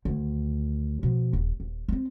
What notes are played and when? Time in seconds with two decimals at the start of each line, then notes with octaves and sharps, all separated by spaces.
0.05 D2 D#3
1.03 B2 F3
1.33 D#1
1.60 D#1
1.89 B3 C4